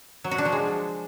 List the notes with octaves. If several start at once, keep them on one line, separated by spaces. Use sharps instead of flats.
F#3
F#4
D4
F3
G#3